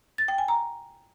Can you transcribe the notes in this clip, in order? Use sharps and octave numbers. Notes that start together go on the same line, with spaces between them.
A6
G5
G#5
A#5